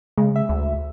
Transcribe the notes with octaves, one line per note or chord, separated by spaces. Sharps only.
C#3 G#3
E5
D2